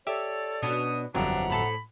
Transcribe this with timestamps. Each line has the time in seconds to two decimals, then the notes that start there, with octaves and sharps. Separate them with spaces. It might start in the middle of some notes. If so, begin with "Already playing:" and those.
0.07 G4 A4 C#5 D5 E5
0.62 B2 C#4 D4 D#6
1.15 G1 F2 F#3 C4 D4 E5 F#5 A#5
1.50 A2 A4 B5